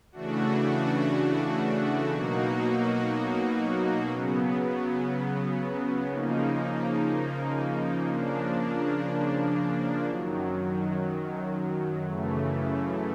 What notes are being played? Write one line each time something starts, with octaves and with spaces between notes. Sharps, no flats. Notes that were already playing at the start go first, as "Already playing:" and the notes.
C#3 E3 A3 D4 F#4
B2 F#3 A#3 D#4 F#4
C#3 F#3 B3
C#3 F3 A#3 D#4
C#3 F3 A#3 D4
F#2 D#3 F#3
F#2 C#3 E3 A3